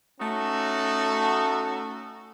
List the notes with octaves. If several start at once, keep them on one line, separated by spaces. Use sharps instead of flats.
A3 C#4 D#4 F#4 A4